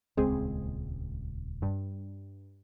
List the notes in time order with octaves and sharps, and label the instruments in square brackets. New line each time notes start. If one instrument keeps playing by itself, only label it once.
[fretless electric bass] D#1 C#2 [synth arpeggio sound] G#3 C4 G#4
[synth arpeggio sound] G2